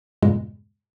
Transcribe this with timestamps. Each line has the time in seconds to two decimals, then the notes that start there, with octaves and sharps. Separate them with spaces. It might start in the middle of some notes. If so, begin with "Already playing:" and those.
0.22 E2 G2 A#2 C#3 G#3